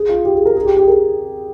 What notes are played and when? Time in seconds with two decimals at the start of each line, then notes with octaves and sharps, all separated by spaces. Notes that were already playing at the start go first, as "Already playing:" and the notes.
Already playing: G#4
0.09 F4
0.25 G4
0.35 G#4
0.46 A#4
0.56 G#4
0.66 G4
0.77 G4
0.83 G#4
0.88 A#4